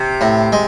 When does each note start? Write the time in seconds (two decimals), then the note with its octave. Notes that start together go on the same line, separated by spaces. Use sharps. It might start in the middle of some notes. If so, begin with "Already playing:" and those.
Already playing: C3
0.21 A2
0.52 G#3